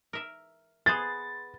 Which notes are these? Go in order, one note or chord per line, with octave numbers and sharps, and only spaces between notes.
A#4 E5
B3 G#4 C5 A6